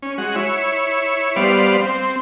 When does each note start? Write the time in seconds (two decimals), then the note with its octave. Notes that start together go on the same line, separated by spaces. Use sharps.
0.02 C#4
0.18 G#3 F#4
0.36 E4 C#5
1.36 G3 B3 C5 D5 F5
1.81 C4